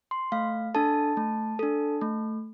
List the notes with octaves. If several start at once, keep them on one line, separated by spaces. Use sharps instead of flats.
C6
A3 F5
D4 A4 A5
A3
D4 A4
A3